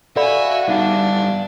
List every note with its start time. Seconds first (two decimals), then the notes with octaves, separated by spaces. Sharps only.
0.16 F#4 A4 D5 E5 F5 G#5 B5
0.68 G3 B3 D4 D#4 F#5